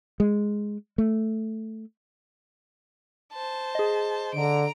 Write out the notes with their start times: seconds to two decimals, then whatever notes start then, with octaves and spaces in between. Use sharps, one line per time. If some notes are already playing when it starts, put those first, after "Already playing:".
0.20 G#3
0.98 A3
3.33 C5 A5
3.75 G#4 D#5
4.34 D3 A#5 D7